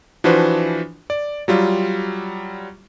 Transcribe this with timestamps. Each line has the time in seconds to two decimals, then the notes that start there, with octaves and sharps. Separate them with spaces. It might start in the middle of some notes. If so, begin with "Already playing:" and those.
0.24 E3 F3 D4 F#4 B4 C5
1.10 D5
1.48 F#3 G3 F4